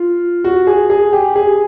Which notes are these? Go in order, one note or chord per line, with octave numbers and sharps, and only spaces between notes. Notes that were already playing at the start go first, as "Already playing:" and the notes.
Already playing: F4
F#4
G#4
G#4
G4
G#4